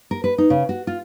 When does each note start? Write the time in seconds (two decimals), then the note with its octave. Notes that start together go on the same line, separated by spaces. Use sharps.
0.11 A#4
0.24 B4
0.38 D#4
0.50 C#3
0.69 F#4
0.87 F4